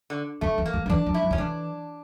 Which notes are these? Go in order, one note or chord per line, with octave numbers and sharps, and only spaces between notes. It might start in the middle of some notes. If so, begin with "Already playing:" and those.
D3
D3 A3
E3
A#3
E3
F3
E3 D4
F3
E4
F3
D3 C#4
E3 D4